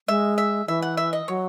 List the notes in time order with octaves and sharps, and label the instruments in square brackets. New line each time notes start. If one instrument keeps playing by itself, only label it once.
[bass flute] G#3 [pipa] E5
[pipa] E5
[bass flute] E3 [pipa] E5
[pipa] F#5
E5
D#5
[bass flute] F#3 [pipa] C#5